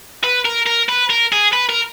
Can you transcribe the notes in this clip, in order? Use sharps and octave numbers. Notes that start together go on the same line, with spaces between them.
B4
A#4
A#4
B4
A#4
G#4
B4
A#4